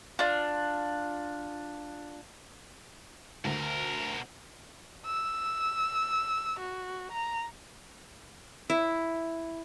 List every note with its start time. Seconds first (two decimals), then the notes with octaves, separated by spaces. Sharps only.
0.19 D4 F4
3.45 D2 B2 A#4
5.06 E6
6.60 F#4
7.12 A#5
8.70 E4